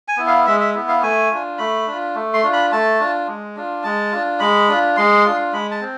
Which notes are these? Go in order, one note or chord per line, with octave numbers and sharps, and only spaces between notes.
G#5
B3 E4
F5
G#3 E5
E5
B3 E4
F5
A3 G#5
D4 F4
A3 B5
D4 F4
A3
C6
D4 F4
B5
A3 A5
D4 F4
G#3
D4 F4
G#3 A5
D4 F4
G#3 B5
D4 F4
G#3 C6
D4 F4
G#3 B5
A5
C4